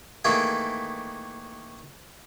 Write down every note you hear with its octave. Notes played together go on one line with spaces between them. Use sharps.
D#3 E3 A3 A#3 G#4